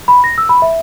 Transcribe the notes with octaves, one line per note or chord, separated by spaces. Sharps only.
B5
A#6
E6
B5
E5